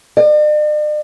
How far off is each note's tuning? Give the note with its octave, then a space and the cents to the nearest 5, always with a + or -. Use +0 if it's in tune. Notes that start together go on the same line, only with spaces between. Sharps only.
D5 +45